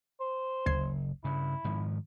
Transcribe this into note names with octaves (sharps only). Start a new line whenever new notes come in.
C5
F#1 D2 G#6 C7
G2 C#3 E4
G#2 D#3 F3